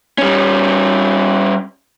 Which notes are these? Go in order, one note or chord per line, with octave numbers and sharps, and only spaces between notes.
G3 C#4